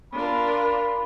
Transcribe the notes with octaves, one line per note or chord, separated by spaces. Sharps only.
D4 F4 A#4 B5